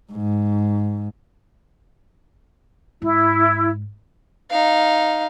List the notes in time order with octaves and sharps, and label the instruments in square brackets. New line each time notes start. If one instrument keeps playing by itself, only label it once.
[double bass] G#2
[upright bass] G#2 [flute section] E4
[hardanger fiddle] D#4 F5